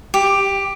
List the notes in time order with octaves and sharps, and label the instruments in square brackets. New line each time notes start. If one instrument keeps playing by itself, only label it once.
[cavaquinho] G4